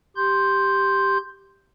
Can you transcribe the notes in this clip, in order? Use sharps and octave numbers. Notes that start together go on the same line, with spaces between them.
G4 C6 G6